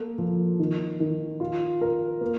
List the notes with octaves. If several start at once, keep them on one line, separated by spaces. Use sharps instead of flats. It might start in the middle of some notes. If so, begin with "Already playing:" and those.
Already playing: A#3 A4
F3
D#3
D#3
F4
A#4
A#3